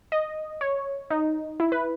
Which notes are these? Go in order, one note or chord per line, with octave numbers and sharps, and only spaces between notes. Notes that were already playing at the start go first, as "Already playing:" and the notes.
D#5
C#5
D#4
E4
B4